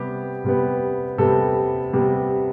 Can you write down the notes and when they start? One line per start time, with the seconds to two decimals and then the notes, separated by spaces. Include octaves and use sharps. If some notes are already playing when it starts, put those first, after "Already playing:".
Already playing: C3 G3 B3 G4
0.44 C3 G3 B3
1.18 C3 G3 B3 A4
1.93 C3 G3 B3